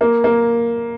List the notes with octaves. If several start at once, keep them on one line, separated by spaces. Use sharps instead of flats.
A#3
A#3